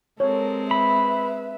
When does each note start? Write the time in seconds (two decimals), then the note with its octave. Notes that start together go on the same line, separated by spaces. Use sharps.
0.20 G#3 C4 A4 A#4 C#5
0.71 B4 E5 B5